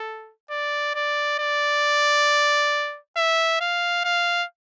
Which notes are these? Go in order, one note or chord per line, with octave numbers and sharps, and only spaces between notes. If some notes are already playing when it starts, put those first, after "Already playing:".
Already playing: A4
D5
D5
D5
E5
F5
F5